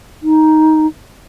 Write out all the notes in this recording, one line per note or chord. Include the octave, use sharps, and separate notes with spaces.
D#4